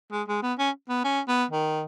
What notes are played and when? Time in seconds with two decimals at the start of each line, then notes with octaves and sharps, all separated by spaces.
0.12 G#3
0.27 G#3
0.42 B3
0.58 C#4
0.89 B3
1.04 C#4
1.28 B3
1.51 D#3